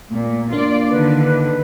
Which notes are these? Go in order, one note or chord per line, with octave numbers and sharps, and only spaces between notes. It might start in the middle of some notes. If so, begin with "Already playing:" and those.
A#2
A#3 D4 F4 D5
D3 D#3 B4